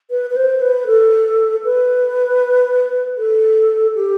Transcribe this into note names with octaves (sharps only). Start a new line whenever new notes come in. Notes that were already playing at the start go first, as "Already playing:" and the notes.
B4
B4
C5
B4
A4
B4
A4
G4